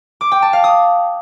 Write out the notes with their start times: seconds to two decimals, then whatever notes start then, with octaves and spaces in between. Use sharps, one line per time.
0.21 D6
0.32 G5
0.42 A5
0.53 F5
0.64 D#6